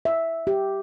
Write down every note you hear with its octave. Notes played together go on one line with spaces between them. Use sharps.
E5
G4